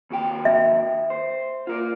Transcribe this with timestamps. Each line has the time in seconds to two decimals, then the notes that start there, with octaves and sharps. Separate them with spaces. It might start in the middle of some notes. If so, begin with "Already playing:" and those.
0.10 D#2 F#4 G5
0.45 E5
1.10 C5
1.67 F4 A#4 D5